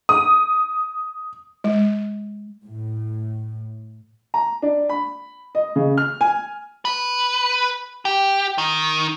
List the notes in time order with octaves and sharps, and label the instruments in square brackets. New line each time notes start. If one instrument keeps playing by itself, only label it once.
[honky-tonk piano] D#6
[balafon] G#3
[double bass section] A2
[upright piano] A#5
D4
B5
D#5
C#3
F6
G#5
[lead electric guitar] B4
G4
D#3